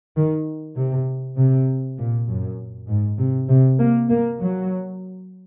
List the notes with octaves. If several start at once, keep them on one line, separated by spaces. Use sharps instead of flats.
D#3
C3
C3
A#2
F#2
G#2
C3
C3
A#3
A#3
F#3